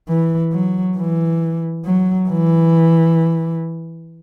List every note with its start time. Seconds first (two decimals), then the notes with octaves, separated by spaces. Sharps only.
0.09 E3
0.52 F#3
0.97 E3
1.85 F#3
2.29 E3